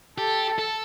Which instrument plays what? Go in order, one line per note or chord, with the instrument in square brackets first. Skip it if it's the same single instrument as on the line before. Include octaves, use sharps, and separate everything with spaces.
[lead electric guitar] G4 [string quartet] A4
[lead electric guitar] A4